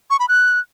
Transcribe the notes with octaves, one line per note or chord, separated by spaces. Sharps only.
C#6
B5
F#6